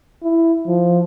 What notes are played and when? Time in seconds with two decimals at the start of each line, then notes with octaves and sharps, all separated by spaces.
0.23 E4
0.67 F3